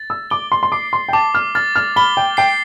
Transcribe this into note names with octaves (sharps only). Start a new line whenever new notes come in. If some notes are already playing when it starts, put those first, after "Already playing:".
Already playing: A6
E6
D6 G7
C6
C6
D6 C7
C6
G5
A5 D6
F6
F6 A6
F6
B5 G7
G5
G5 C7